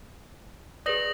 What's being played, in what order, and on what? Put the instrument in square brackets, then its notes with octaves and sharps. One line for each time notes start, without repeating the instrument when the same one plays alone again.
[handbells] G#4 B4 D5 [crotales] D#6 A#6 F#7